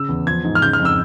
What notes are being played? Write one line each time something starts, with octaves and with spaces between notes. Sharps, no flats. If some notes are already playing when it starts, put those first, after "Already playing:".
Already playing: C#3 E6
E2
F3 G#6
G#2
F6
C#3 G6
F6
F2
E6